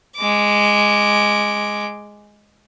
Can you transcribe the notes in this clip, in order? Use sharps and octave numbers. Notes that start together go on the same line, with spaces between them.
G#3 D6